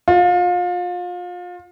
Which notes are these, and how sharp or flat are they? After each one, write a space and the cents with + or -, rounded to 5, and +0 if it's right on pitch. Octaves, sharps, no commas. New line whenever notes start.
F4 +30